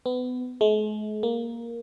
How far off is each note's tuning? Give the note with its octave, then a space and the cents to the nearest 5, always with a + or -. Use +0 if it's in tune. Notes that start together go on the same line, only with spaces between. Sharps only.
B3 +25
G#3 +45
A#3 +5